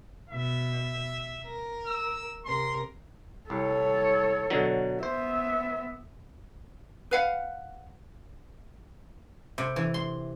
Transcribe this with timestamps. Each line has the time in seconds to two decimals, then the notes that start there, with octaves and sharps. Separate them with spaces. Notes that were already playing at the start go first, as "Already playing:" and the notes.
0.30 B2 E5
1.46 A#4
1.87 E6
2.45 C3 A#4 C6
3.50 C2 A4 C#5
4.50 B2 D3 F#3
5.03 B3 C5 E5
7.11 B4 F5 F#5
9.58 C3
9.76 E3
9.94 C6